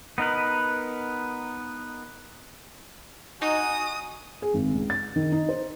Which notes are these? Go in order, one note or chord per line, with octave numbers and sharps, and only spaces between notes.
B3 D#4 A#4 B4
D#4 F#4 G#5 D#6
G#4
G#1
C#2
A6
D#3
D#4
C5